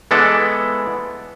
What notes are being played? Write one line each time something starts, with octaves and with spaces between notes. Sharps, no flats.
E3 G#3 B3 A4 D5